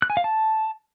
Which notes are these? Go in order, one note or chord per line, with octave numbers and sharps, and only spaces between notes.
F#6
G#5
F5
A5